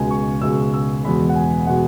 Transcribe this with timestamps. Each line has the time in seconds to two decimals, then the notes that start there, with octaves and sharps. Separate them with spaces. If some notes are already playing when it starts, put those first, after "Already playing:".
Already playing: C#2 B2 G#3 G#5
0.11 C#6
0.42 C#2 B2 G#3 E6
0.74 E6
1.04 E2 B2 G#3 B5
1.29 F#5
1.35 G#5
1.67 B2 G#3 F#5